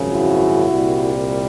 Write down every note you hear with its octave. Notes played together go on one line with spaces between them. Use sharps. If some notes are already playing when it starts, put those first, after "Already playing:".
Already playing: G#1 F#2 C#3 F3
E4 F#4
C2 A#2 G3